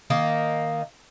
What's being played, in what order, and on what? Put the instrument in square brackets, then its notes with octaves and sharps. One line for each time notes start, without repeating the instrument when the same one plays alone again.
[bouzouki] D#3 A#3 D#4